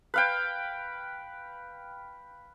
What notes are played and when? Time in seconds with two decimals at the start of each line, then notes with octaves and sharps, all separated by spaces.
0.14 B4 F5 G5